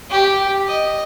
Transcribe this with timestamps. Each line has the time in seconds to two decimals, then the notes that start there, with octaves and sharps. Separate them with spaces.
0.10 G4
0.68 D#5